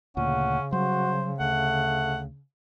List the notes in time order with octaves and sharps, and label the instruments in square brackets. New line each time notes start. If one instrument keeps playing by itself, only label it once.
[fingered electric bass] D2 A#2 [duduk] C#3 [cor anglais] C#4 [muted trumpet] F#5
[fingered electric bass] F#3 G3 [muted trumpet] F#4 [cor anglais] C5
[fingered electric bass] D2 [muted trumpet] A3 [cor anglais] F#5